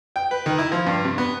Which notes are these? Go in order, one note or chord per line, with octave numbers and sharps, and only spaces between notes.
G5
B4
D#3
E4
F3
G2
C3
B3